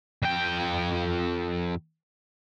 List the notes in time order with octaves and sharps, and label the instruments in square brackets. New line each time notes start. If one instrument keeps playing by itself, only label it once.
[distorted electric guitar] F2 G5